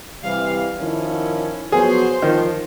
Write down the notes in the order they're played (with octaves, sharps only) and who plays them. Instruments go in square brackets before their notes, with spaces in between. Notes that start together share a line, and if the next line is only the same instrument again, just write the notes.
[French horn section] C3 E3 G3 [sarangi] F5
[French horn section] D#3 F3 E4 [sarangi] C#4
[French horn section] F3 F#3 B3 [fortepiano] G#4 [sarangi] C5
[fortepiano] D#3 [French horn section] F3